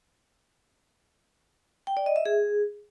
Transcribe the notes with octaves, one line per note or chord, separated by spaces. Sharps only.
G5
D5
D#5
E5
G#4